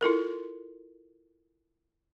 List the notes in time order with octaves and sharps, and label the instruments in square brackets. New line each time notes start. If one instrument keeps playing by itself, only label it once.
[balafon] E4 F4 A4 A#4